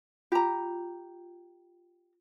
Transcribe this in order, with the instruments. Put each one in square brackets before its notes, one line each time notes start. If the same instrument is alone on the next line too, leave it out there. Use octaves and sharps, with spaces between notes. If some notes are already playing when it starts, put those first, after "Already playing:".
[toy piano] F4 [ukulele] G4 A#5